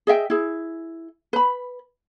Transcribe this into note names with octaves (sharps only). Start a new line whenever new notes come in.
G#4 D#5 E5 G5
E4 G#4
B4 B5